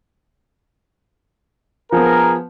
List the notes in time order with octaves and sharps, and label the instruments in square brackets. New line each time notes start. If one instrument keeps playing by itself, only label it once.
[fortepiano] F3 B3 [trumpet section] G#4 A#4